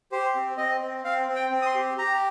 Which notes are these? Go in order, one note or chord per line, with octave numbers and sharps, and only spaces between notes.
G4 C5
C4
C4 D#5
C4
C4 F5
C4
G5
C4
D#6
C6
G4
G4 A#5